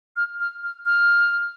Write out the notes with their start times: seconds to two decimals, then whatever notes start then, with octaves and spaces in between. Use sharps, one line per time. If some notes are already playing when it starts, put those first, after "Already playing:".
0.16 F6
0.40 F6
0.63 F6
0.85 F6